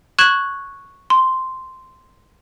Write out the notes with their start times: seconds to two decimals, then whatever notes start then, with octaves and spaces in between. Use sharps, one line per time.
0.19 C#6 F#6 G#6 E7 F#7
1.10 C6